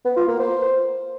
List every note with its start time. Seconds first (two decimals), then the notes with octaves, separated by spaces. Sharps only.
0.05 B3
0.17 F4
0.28 A#3
0.39 C5